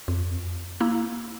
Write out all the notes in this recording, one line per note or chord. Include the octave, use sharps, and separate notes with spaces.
F2
A#3 E4